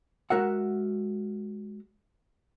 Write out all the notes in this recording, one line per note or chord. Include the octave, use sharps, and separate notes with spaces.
G#3 F#4 A#4 E5 F#5